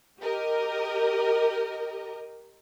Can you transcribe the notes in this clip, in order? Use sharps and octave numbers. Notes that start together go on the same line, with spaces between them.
G4 A#4 D#5